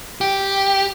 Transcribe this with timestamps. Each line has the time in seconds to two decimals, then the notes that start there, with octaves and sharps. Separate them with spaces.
0.21 G4